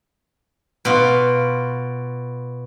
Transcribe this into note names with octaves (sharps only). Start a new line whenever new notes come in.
B2 F4